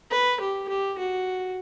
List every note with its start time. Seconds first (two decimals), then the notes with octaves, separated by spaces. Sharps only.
0.11 B4
0.40 G4
0.69 G4
0.98 F#4